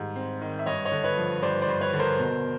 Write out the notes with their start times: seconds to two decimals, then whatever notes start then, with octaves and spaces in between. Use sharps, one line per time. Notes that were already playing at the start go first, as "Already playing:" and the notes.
Already playing: G#2 D#3 G3
0.16 C4
0.41 D#3
0.59 E5
0.66 G2 C#5 D#5
0.85 C#5 D#5
0.92 D3
1.04 B4 C#5
1.17 F3
1.42 G2 C5 D5
1.62 C5 D5
1.68 G2
1.81 B4 C#5
1.93 D3
2.00 A#4 C5
2.19 B2